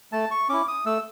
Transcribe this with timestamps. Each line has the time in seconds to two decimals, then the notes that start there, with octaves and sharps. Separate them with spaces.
0.12 A3 A5
0.31 C#6
0.49 C#4 E4 D6
0.68 D#6
0.85 A3 E6